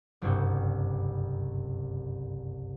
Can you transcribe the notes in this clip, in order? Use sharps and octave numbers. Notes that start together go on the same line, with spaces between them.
F#1 C2 G2 C3 F#4 G6